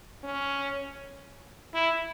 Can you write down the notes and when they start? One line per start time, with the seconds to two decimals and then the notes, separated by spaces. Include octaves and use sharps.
0.24 C#4
1.74 E4